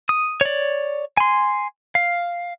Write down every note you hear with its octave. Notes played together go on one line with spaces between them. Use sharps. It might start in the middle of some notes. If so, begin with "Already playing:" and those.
D#6
C#5 D5
G#5 C6
F5